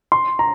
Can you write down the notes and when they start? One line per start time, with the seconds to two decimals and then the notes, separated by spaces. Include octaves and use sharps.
0.12 C6
0.39 A#5